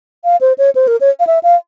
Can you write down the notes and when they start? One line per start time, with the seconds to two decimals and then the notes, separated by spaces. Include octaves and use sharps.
0.24 F5
0.41 C5
0.58 C#5
0.75 C5
0.88 A#4
1.01 C#5
1.20 F5
1.27 E5
1.43 F5